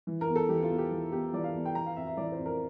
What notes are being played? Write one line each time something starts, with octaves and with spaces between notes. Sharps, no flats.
E3
A#4
E2
A4
E3 G4
F4
E2
G4
E3
E2 G4
E3 D5
F5
E2
G5
E3 A#5
F5
F2 E5
E5
E3 D5
C5
F2
A#4